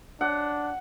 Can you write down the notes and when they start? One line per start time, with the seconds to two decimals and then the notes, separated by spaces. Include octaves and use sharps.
0.21 D4 F#5